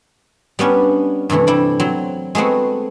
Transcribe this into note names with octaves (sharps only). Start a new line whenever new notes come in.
G3 B3 C#4 D4
G2 C3 E3 A3
G3 E4 D5
F#3 C4
G#3 A3 B3 C4 F#4